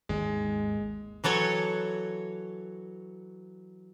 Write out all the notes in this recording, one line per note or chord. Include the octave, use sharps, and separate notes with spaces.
G#1 D#2 G#3
E3 F#3 A4 C#5 A5